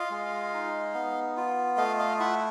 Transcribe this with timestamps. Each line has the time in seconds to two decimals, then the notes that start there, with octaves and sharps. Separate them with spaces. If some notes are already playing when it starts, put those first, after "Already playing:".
Already playing: F4 D#5 F5
0.11 G#3
0.54 D#4
0.94 B3
1.37 F4
1.77 A3 D#5 F5
1.99 D#5 F5
2.20 E4 E5 F#5